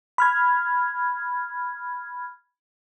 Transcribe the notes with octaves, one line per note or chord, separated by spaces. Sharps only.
B5 F6 G#6